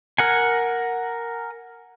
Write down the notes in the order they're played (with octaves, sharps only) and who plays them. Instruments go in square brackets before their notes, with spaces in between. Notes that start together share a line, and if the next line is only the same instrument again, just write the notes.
[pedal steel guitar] A#4 F#5 G#5